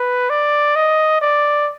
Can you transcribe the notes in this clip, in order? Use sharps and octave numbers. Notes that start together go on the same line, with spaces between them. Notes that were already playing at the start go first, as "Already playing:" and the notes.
Already playing: B4
D5
D#5
D5